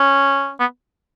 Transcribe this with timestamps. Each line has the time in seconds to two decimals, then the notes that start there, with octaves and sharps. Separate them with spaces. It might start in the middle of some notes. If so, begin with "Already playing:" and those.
Already playing: C#4
0.60 B3